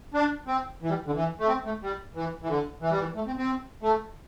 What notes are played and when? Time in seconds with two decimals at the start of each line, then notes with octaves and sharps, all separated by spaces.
0.14 D4
0.47 C4
0.82 E3
0.89 G3
1.06 D3
1.14 E3
1.39 A3
1.48 C4
1.65 A3
1.82 G3
2.15 E3
2.42 E3
2.49 D3
2.81 E3
2.91 G3
2.99 E3
3.15 A3
3.27 C4
3.38 C4
3.82 A3